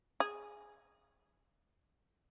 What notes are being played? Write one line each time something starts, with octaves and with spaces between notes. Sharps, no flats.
G#4